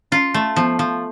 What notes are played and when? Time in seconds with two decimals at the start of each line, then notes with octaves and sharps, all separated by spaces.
0.12 C#4 F4
0.34 A3
0.56 F3 B3
0.79 F3